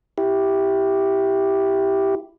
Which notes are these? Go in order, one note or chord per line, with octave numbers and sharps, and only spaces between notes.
E4 G4